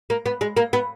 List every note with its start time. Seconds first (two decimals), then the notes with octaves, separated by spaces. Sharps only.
0.10 A#3
0.26 B3
0.41 G#3
0.57 A#3
0.73 B3